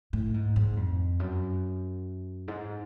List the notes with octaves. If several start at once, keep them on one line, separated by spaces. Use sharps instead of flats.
A2
G#2
G#2
F2
F#2
G#2